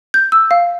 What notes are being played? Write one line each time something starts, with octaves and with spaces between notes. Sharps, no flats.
G6
E6
F5